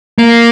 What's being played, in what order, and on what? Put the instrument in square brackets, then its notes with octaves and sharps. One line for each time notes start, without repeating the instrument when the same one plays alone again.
[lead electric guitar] A#3